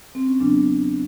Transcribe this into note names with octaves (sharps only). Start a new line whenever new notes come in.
C4
C#4
E2 C#3 F#3 B3 D4